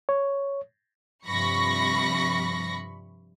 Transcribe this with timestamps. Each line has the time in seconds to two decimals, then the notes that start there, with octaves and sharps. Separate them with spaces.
0.09 C#5
1.26 G2 C3 F3 B5 C#6 A#6